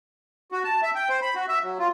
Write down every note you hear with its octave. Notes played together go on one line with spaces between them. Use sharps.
F#4
A5
E5
G5
C5
B5
F#4
E5
F#3
F4